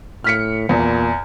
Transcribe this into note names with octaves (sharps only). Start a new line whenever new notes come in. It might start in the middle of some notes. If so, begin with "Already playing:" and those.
A2 F6 B6 C#7
E2 A#2